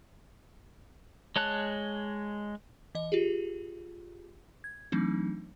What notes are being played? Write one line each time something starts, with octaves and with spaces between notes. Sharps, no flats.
G#3 C#5 A5 F#6
E3 D#5
F4 G4 G#4
G#6
E3 F#3 A3 C4 D4 D#4